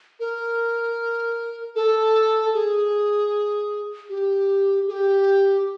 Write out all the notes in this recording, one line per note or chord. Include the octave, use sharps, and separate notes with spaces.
A#4
A4
G#4
G4
G#4
G4